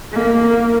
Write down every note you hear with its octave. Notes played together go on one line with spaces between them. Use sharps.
A#3